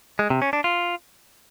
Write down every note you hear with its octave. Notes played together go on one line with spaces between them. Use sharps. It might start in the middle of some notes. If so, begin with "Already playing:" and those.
G#3
C3
C#4
D4
F4